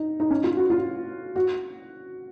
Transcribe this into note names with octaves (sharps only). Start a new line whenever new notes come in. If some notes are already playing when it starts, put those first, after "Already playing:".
Already playing: D#4
D#4
C#4
F4
F#4
F4
F#4